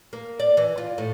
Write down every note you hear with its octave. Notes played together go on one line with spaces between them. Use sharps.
A#3
D5
E3
F4
A2